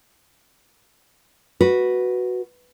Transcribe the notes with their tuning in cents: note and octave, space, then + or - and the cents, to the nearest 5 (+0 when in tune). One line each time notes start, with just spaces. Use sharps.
F#4 +0 B4 -5